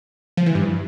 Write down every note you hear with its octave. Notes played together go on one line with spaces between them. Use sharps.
F3
E3
G2